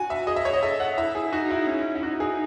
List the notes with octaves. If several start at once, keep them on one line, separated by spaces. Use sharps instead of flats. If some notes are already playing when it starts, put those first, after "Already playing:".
Already playing: F#4 G#5
E5
G#4 D#5
E5
C#5
D#5
A4 E5
F#5
E4 E5
G#4
D#4 F#4
E4
C#4
E4
D#4 F#4
G#4